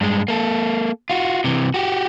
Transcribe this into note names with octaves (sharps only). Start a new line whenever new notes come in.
G2 G#3
A#3 A4
F4 F#4
C3 E3
F#4 G4